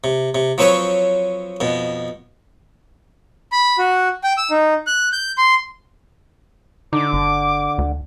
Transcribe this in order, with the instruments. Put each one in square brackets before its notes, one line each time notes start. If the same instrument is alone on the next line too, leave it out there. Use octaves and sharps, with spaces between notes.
[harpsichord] C3
C3
F3 F#3 C4 B4 C#5
F2 B2
[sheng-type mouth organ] B5
F#4
G5
E6
D#4
F#6
G6
C6
[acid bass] D3 [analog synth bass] D#4 [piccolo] D6
[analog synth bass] G1
D2